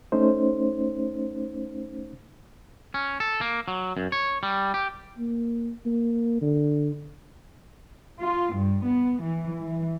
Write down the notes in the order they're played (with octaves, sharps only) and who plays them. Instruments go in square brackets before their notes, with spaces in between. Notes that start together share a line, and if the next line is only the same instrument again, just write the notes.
[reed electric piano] A3 C#4 D#4 C5
[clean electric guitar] C#4
A4
A#3
F#3
F#2
C#5
G3
G4
[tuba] A#3
A#3
D3
[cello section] F4
G2
B3
E3
E3